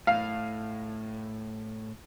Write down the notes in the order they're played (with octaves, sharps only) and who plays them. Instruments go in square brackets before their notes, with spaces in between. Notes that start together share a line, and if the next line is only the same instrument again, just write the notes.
[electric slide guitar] A2 [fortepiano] F5